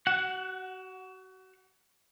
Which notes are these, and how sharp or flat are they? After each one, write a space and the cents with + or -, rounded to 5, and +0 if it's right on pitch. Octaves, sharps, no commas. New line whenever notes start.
F#4 +30 F#5 +0